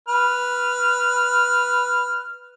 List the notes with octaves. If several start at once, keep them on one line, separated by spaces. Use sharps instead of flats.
B4 F6